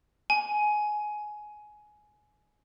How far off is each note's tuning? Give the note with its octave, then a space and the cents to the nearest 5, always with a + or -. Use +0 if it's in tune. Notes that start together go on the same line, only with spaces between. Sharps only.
G#5 +15